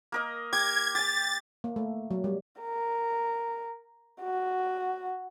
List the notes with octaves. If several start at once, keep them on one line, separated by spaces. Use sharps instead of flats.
A#3 A#4 D#5
G4 D6 G#6
G4 G#5 A6
A#3
A3
F#3
G3
A#4
F#4